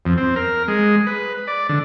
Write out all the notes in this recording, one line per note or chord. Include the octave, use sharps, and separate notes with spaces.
F2
C4
A#4
G#3
B4
D5
D3